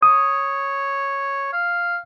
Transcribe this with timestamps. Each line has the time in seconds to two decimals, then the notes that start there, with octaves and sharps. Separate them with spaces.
0.03 C#5 D#6
1.53 F5